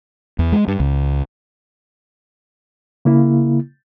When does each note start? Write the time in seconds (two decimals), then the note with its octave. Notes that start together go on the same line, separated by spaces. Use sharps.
0.39 E2
0.52 G#3
0.68 G2
0.80 C#2
3.05 C#3 A#3 E4